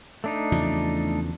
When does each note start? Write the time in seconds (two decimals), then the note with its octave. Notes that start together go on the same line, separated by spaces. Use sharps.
0.24 A3 D4 D#4
0.52 E2 C#3 F3